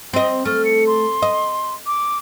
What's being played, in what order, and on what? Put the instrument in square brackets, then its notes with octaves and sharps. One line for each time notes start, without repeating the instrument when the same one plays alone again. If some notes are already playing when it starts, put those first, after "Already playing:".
[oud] C4 D#5
[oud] A3 [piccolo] F6
[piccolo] C#7
C6
[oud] D#5
[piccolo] D6